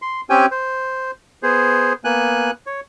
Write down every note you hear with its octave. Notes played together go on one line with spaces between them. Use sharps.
C6
C4 C#4 G4 G5 G#5
C5
B3 G#4 C5
A#3 B3 G#5 F#6
C#5